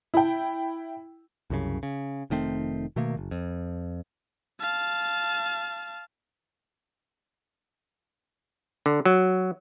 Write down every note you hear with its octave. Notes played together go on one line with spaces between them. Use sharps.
E4 G5
C2 F#2 C#3
C#3
F1 D#3 A3 C4
B2 D#3 A3 A#3
F#1
F2
F5 A5
D3
F#3